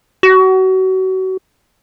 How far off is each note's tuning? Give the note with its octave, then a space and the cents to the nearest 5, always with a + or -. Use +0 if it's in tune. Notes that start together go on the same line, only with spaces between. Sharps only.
F#4 +30